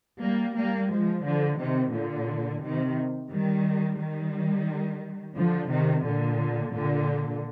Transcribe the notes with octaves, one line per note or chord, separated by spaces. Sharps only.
G3 A#3
G3 A#3
F3 G#3
D3 F3
C3 D#3
A#2 D3
C3 D#3
D#3 G3
D#3 G3
D3 F3
C3 D#3
A#2 D3
A#2 D3